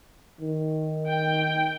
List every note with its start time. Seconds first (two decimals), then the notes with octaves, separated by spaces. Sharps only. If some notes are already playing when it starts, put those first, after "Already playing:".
0.41 D#3
1.08 G5